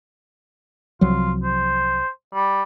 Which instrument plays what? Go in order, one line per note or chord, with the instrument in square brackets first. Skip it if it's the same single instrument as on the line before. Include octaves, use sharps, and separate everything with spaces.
[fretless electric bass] C2 F3 F#3 [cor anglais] F4
[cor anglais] C5
G3